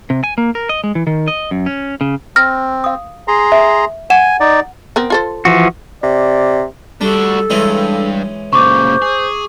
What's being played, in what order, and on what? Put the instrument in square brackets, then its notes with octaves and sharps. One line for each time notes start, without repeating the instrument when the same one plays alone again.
[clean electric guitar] C3
G#5
A#3
A#4
D#5
G#3
E3
D#3
D#5
F#2
C#4
C#3
[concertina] C4 [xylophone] F6 A#6
[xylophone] F5 D#6
[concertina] G#4 A#5 C6
[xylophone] E5
[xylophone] F#5 E7 [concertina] G#5
[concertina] D#4 D5
[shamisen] B3 C4 A#4
F4 A4 C5
[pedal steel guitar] E3 F3 F#4
[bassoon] C3 [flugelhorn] D5
[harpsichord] G3 [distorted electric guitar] D4 F#4 [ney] A4
[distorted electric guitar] G2 [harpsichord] E3 G#3 C#4
[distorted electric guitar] A#2 C#3 [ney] C5 [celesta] C#6 D6
[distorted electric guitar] G#4